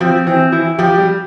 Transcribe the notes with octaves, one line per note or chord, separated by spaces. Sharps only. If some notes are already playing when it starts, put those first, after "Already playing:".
F3 C4
E3 C4
E3 E4
F3 G4
G3